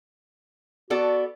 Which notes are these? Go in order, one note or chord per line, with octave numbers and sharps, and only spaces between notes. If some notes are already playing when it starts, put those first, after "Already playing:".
B3 F#4 A4 D5